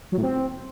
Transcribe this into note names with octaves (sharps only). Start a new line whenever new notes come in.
F#3
A2
C4